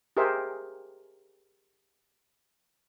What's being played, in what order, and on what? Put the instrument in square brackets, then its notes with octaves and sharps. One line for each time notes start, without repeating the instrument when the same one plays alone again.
[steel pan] G4 G#4 A#4 C5 E5